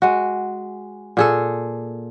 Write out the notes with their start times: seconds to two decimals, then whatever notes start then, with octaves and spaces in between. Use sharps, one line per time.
0.02 G#3 F#4
1.17 A#2 G#4 A4